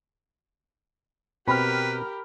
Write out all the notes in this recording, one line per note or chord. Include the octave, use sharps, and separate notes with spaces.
B2 C4 G4 A#4 B4 B5 F6